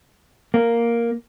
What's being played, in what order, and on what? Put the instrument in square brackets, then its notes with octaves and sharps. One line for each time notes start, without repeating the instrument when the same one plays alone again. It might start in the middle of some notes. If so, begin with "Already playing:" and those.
[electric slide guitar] A#3